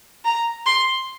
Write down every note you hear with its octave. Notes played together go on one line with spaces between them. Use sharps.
A#5
C6